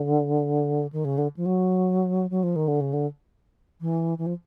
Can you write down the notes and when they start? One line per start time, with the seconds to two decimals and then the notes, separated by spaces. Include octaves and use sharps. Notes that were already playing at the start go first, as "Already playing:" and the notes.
Already playing: D3
0.92 D#3
1.05 C#3
1.18 D3
1.36 F3
1.46 F#3
2.30 F#3
2.43 F3
2.56 D#3
2.68 D3
2.81 C#3
2.93 D3
3.81 E3
4.18 E3
4.26 F3